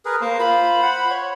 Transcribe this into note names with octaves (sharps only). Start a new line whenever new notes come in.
G#4 A#4 B4
A#3 C5
F4 B5
F#5
C#5